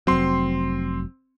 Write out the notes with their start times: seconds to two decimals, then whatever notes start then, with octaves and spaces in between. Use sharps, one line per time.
0.07 F1 F#3 C4 C6